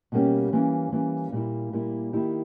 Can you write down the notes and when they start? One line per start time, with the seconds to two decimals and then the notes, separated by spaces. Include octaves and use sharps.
0.12 B2 G3 A#3 C#4 G4
0.53 E3 G3 A#3 C#4
0.92 E3 G3 A#3 C#4
1.32 A#2 G3 A#3 E4
1.72 A#2 G3 A#3 E4
2.13 D#3 A#3 E4 G4